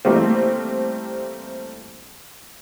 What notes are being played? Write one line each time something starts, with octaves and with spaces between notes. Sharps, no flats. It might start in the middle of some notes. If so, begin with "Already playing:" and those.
E3 G3 A3 A#3 C4